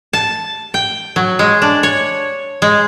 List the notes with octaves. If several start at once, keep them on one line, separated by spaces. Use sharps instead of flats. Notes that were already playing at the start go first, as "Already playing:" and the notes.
A5
G5
F#3
G#3
D4
C#5
G#3